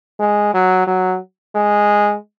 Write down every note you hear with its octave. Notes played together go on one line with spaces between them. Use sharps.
G#3
F#3
F#3
G#3